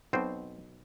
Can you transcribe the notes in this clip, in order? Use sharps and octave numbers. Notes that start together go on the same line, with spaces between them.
B1 B2 C4 C5